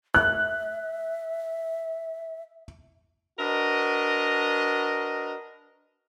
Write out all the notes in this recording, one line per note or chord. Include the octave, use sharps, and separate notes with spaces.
E5 F#6
D4 F#4 A#4 B4 D#5